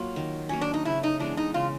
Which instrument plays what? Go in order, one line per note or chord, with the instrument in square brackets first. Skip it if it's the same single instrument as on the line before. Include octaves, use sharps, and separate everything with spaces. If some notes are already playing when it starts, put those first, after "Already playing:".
Already playing: [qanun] F#3 A#3 [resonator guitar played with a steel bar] F4
[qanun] D#3
[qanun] F#3 A#3 [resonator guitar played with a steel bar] C#4
[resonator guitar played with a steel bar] D4
D#4
[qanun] C#3 [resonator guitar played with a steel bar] E4
[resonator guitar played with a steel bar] D#4
[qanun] E3 G#3 B3 [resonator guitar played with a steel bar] D4
[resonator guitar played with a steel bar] D#4
[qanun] C#3 [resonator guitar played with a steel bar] F4